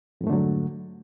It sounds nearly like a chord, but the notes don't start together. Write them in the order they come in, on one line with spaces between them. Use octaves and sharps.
F2 G#2 A3 D3 F#3